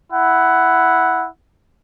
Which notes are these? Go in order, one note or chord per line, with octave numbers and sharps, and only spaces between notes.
E4 F#5